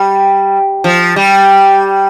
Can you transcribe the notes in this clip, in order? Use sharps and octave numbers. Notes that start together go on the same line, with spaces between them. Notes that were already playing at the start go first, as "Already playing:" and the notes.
Already playing: G3
F3
G3